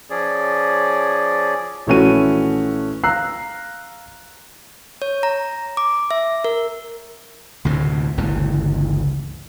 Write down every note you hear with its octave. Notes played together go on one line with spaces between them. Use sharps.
F3 C#4 G#4 D5
A#1 E3 A3 C#4 F#4 D#7
F5 A#5 E6 F#6 C7
C#5
A#5
D6
E5
A#4
D2 A2 C3
G1 C#2 A#2 E3